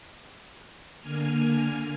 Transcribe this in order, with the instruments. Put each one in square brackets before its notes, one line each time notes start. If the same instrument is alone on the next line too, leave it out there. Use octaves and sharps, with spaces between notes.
[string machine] D3 A#3 G#5 F6